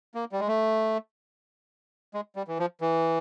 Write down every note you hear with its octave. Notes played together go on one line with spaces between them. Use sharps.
A#3
G3
G#3
A3
G#3
G3
E3
F3
E3